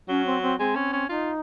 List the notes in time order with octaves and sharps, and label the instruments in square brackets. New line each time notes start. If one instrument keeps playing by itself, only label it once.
[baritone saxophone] F#3 [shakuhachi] C#4
[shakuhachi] C4
C4
[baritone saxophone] G#3 [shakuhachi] C4
[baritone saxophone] C#4
C#4
[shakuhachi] D#4 [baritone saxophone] F4